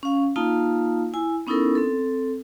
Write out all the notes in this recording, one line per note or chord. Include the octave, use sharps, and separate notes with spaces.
C#4 F5
A#3 D#4 F4 F5 A5
E4 G#5
B3 C#4 D#4 E4 A4 A#4
C4 A4